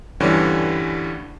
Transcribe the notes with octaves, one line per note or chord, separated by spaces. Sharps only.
D2 G2 D3 E3 G3 C#4